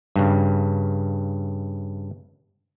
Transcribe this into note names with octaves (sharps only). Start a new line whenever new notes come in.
G2 C#3